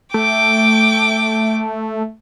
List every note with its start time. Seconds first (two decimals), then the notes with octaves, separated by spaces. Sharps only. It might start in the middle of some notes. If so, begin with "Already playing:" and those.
0.14 A3 G5 D6